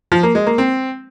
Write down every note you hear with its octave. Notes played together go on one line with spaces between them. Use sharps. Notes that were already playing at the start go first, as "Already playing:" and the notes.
F3
A#3
G#3
A#3
C4